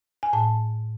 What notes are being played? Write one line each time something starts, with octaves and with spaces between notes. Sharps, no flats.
G#5
A2 A5